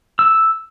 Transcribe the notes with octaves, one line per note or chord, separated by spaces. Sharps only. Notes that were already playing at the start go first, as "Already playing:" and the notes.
E6